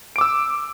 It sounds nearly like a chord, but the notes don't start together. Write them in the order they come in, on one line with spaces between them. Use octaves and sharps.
D7 D6 E6